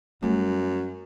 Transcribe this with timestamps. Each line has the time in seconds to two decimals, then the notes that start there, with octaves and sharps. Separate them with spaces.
0.22 F#2 G3 A3